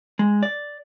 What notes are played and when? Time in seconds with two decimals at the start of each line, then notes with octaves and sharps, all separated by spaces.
0.19 G#3
0.43 D5